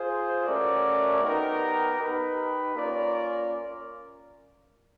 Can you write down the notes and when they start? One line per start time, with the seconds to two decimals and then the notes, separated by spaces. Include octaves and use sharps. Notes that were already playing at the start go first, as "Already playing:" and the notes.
Already playing: F4 G#4 C5
0.45 A3 C#4 F#4 A#4 D5
1.22 B3 D#4 G4 A#4
1.99 D#4 G4 B4
2.75 A#3 C#4 F4 A#4 D5